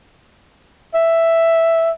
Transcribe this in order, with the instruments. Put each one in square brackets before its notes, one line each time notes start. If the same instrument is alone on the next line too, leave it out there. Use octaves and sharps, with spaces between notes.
[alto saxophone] E5